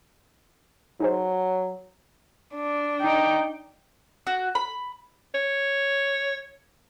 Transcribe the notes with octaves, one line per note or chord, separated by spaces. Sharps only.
F#3 D#4 G#4 C5
D4
D#4 G5
F#4
B5
C#5